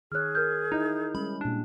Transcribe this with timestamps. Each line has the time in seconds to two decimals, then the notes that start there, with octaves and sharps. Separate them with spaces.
0.12 D#3 G#4 C#5 F6 F#6
0.35 A#4 F6 G6
0.72 D#4 E4 D#5
1.15 G3 G#3 C#4 B5
1.41 A#2 D4 G4